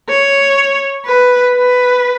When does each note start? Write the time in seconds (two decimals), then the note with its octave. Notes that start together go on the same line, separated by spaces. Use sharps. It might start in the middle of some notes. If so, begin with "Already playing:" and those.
0.09 C#5
1.06 B4
1.56 B4